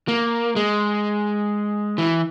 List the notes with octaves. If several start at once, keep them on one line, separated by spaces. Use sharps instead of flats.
A#3
G#3
E3